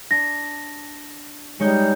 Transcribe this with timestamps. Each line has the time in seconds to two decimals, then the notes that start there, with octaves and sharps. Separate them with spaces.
0.11 D4 A#6
1.60 G3 G#3 D#4 C#5 G6